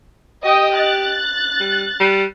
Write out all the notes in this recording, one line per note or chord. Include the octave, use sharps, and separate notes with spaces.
G4 D#5 G5 D#6
F#6 A6
G3
G3